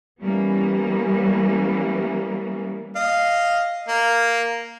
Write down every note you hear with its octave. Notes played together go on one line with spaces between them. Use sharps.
E3 G3 A#3 B3 C#4
D#5 F5
A#3